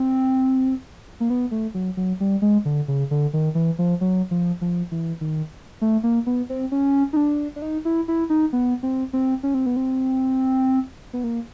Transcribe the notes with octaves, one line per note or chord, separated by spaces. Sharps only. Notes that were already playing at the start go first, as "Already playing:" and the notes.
Already playing: C4
A#3
B3
A3
F#3
F#3
G3
G#3
D3
C#3
D3
D#3
E3
F3
F#3
F3
F3
E3
D#3
A3
A#3
B3
C4
C#4
D#4
D4
D4
D#4
E4
E4
D#4
B3
C4
C4
C#4
C4
B3
C4
B3
A#3